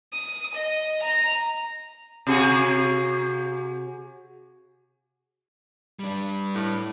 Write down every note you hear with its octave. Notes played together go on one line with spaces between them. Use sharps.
D#6
D#5
A#5
C3 F#4 G#4
G3 D4
A2